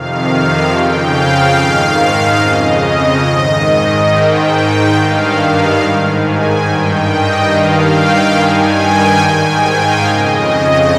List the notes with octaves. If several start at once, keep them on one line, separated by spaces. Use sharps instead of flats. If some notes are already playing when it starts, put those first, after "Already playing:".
Already playing: F2 C3 D#3 F5
F5
F2 C#3 G5
F5
G#2 D#3
F2 C#3 D#5
G#2 D#3
G#2 D#3 G5
G5
G2 D#3 F5
F5
G#2 D#3
G#5
G2 D#3 G5
D#5
G2 D#3 F5
G5
G2 D#3 G#5
G5
G#2 D#3 G#5
G5
F5
F2 C#3 D#5